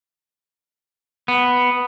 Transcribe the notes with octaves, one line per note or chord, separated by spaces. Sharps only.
B3